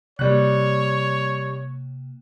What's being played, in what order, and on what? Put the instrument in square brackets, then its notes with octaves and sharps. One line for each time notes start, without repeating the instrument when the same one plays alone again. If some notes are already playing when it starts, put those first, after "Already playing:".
[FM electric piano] C3 A#3 [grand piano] G3 F#6 [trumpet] C#5